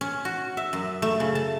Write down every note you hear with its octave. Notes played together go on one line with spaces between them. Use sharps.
C#4
F#4
E5
F#2
A3
C#3
A5